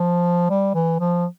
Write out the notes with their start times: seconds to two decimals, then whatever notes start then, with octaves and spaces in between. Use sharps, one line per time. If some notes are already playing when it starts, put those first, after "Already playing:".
Already playing: F3
0.50 G3
0.75 E3
1.00 F3